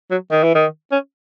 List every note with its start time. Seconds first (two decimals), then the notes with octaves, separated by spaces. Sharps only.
0.11 F#3
0.31 D#3
0.43 E3
0.55 D#3
0.92 C#4